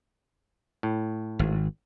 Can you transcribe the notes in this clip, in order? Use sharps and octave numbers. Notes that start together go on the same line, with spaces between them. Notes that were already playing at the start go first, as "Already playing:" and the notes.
A2
G#1